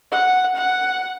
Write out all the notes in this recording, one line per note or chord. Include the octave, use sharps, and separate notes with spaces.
F#5
F#5